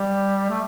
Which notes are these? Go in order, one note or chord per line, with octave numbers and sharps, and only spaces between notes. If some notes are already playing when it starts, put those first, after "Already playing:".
Already playing: G3
A3